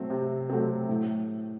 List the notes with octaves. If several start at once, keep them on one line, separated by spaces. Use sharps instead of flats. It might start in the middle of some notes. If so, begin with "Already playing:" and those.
Already playing: F#3 A3 C4
C3
F#3 A3 C4
A2